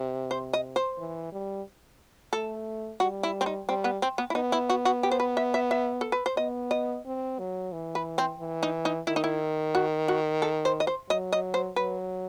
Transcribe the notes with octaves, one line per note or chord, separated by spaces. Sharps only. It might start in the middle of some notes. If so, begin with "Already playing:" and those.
Already playing: C3
C5
D#5
C5
E3
G3
A3 A4
G3 F#4
E4
C4
D#4
G3 C4
B3
C4
B3
E4
B3 D#4
E4
F#4
F#4
G4
C5
B4
E5
E5
E5
A4
B4
C5
B3 D#5
D#5
C4
F#3
E3
B4
C4
E3
D#4
D#4
D#3 E4
D#4
E4
F#4
F#4
A4
C5
D#5
C5
F#3 D#5
D#5
C5
F#3 B4